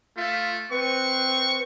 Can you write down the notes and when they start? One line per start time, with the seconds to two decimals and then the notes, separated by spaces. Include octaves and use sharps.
0.17 A3 F4
0.71 C4 B4 C#6